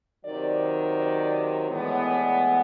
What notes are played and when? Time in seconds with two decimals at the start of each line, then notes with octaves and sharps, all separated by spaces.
0.24 C3 D#3 F#3 D5
0.97 D5
1.70 A2 E3 G#3 B3
2.06 D5